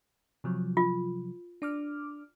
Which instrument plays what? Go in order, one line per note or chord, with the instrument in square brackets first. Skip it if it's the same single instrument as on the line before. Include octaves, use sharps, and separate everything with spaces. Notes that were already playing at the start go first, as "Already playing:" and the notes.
[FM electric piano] C3 F3 F#3
[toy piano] F4
[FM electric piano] D4 D6 F6